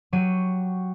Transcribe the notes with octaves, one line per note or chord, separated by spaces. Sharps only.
F#3 F#4 G4 D#7